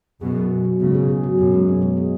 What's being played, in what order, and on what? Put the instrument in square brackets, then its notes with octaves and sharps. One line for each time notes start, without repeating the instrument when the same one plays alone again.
[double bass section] F#2 B2 [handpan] G#4
[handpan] F#3
F#3
F#3
[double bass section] G#2 C#3 [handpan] B3
[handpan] G#4
G#4
F#3
[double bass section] F#2 B2 [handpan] G#4
[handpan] G#3
B3
G#3
G#3